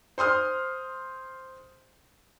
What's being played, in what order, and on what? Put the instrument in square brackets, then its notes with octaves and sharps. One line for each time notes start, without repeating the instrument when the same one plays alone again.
[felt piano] C5 C6 D#6 F6